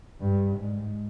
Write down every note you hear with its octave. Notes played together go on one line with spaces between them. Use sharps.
G2
G#2